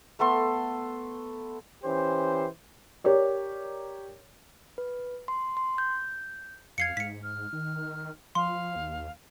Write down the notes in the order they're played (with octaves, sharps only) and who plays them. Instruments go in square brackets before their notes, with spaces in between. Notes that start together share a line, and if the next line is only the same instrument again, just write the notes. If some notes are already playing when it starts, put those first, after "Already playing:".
[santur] A3 B3 A4 C6
[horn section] E3 C#4 G4 C5
[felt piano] G4 A#4 C#5 D5
[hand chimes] B4
C6
C6
G6
[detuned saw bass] F2 [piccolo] F5 [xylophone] G#6 C7 C#7
[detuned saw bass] G#2 [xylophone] B6 C#7
[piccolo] F6
[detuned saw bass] D#3
[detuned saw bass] F3 [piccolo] F5 [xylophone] C6
[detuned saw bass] D#2